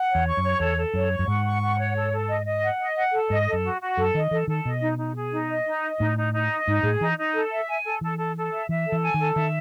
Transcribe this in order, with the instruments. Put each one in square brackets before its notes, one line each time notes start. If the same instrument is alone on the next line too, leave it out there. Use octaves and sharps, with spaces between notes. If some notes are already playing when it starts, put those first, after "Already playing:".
Already playing: [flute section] F#5
C#5
[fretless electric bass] E2
[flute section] C#6
[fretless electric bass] F#2
[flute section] C#5
[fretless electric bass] E2 [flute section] A4
[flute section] A4
[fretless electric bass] F#2 [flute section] C#5
[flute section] C#6
[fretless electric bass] F#2
[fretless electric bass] G#2 [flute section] F#5
[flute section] C#6
F#5
C#5
A4
A4
D#5
D#5
F#5
D#5
F#5
A4
[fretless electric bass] G#2 [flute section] D#5
[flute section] A4
[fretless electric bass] F#2
[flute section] F#4
F#4
[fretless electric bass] F#2 [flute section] A4
[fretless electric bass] D#3 [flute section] D#5
[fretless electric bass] E3 [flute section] A4
[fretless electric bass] D#3 [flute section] A4
[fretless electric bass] B2 [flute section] D#5
[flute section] D#4
D#4
G#4
D#4
D#5
D#4
D#5
[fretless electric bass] A2 [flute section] D#4
[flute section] D#4
D#4
D#5
[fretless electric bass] G#2 [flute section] D#4
[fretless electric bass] A2 [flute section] G#4
[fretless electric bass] E3 [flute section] D#4
[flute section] D#4
A4
E5
G#5
A4
[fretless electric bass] E3 [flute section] A4
[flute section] A4
A4
E5
[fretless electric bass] E3 [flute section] E5
[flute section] A4
[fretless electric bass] E3
[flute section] G#5
[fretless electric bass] D#3
[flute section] A4
[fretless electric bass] D#3 [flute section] E5